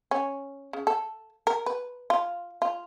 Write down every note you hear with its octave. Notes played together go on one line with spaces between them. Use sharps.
C#4
C#3
A4
A#4
B4
F4
F4